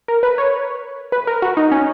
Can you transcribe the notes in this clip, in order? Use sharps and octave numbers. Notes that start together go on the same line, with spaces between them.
A#4
B4
C#5
B4
A#4
F#4
D#4
C#4